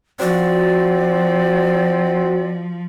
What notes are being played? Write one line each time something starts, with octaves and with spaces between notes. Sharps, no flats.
F3 C4 F#4 D5